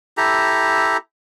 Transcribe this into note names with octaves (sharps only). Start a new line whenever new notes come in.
E4 G4 A4 A#5